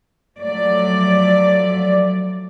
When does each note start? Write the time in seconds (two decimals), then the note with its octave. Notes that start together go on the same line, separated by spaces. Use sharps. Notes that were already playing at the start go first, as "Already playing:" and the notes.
0.41 F3 F#3 A3 D5